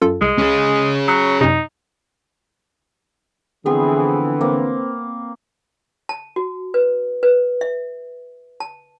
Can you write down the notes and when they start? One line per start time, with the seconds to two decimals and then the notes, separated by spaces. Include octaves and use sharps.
0.02 F#2 F4 A4
0.21 C2 G#3
0.38 C#2 C#4 G#4
1.08 F#3 C#6 D#6 F#6
1.41 F#2 C3 D#4
3.66 D3 E3 F3 B3 C4 G#4
4.41 A#3 C4
6.09 A5
6.36 F#4
6.74 B4
7.23 B4
7.61 E5
8.60 A5